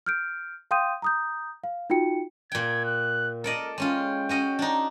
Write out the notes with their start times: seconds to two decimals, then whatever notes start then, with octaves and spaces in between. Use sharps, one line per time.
0.06 F6 G6 D7
0.71 F5 G5 C6 D#6 G6 D#7
1.02 A#5 D#6 G6
1.64 F5
1.90 D#4 F4 F#4 G5 C#7
2.52 A#2 G5 G#6
2.85 F#6
3.44 A4 A#4 D5 D#5
3.78 G#3 C#4 F4 G5
4.29 C#4 F#4 D#5
4.59 D4 D#4